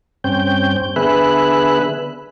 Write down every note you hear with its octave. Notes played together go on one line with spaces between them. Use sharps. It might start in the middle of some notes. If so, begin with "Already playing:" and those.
G2 C4 C#4 G5 G6
D3 B3 G#4 B4 E5 F#6